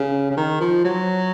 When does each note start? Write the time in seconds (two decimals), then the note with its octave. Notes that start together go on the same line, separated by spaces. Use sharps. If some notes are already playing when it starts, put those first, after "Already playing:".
Already playing: C#3
0.31 C#3
0.37 D#3
0.61 F3
0.84 F#3